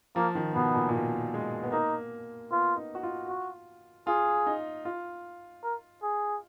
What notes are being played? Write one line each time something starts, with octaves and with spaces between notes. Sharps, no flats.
F3 A#3
D#3
B2 B3
A#2
A#2
B2
G#3
B3
A#3 D#4
B3 F4
D#4
F#4
F4
F#4
F4 G#4
D#4
F4
A#4
G#4